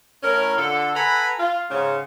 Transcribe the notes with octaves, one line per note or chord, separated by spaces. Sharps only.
A2 C#4 A#4
D3 F4 A4
A4 B4 F#5 G#5 A#5 B5
F4
G#2 C#3